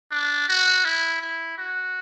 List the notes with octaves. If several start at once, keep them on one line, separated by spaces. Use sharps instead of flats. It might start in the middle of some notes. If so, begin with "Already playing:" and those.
D4
F#4
E4
E4
F#4